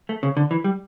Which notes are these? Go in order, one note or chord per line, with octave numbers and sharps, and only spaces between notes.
A3
C#3
D3
E3
G3